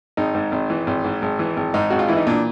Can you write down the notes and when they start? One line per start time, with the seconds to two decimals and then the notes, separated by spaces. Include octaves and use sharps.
0.17 G#1 D#4
0.35 G#2
0.52 G#1
0.70 E3
0.87 G#1
1.04 G#2
1.22 G#1
1.39 E3
1.57 G#1
1.74 G#2 D#4
1.90 G#1 F#4
1.99 F4
2.08 E3 E4
2.17 D#4
2.27 A#2 D4